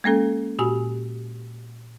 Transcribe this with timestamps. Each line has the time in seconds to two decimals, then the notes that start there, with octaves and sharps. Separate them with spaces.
0.04 G#3 A#3 C#4 A4
0.59 A#2 F#4 G4 G#5